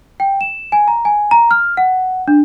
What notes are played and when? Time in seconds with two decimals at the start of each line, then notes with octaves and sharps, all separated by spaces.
0.20 G5
0.41 E7
0.72 G#5
0.88 A#5
1.05 G#5
1.31 A#5
1.51 F6
1.77 F#5
2.28 D4